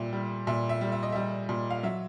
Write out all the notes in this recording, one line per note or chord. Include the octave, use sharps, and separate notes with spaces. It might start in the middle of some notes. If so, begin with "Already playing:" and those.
Already playing: A#2 G3 E5
G3
A#2 E5
E5
G3
E5
D#5
G3 E5
A#2
F5
F#3 E5